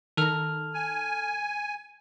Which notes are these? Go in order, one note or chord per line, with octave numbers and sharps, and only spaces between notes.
D#3 A4 A#5 F6
G#5